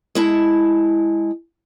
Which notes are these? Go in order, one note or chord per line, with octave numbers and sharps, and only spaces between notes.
G#3 E4 A5